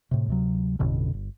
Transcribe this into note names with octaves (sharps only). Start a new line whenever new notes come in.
A2 C3
D2 C3 F#3
A1 F2 B2 D3
G1